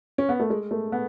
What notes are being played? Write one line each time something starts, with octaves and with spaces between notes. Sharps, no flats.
C#4
B3
A3
G#3
A3
B3